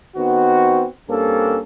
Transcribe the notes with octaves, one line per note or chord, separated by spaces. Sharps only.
D#3 B3 C4 F#4
G2 A#3 C4 C#4 A4